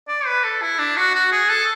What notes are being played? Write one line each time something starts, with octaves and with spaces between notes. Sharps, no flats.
D5
B4
A4
E4
D4
F#4
F#4
G#4
A4